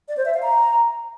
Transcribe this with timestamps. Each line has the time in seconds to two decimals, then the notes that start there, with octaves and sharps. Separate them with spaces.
0.08 D5
0.17 C5
0.25 E5
0.34 F5
0.42 A#5